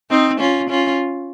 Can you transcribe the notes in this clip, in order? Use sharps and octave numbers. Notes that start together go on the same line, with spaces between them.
C4 D#4
C#4 F4
C#4 F4